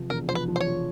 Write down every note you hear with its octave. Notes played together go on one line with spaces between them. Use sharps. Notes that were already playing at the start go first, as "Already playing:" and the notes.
Already playing: E2 C3 F3
E1 A#4
F3 C5
B4
F3
C5
C#5
F3